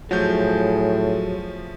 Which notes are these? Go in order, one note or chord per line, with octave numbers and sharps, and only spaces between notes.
A2 F3 F#3 A3 G#4 G6